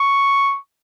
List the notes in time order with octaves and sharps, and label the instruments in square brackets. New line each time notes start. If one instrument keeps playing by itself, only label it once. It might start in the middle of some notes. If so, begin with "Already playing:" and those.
Already playing: [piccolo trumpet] C#6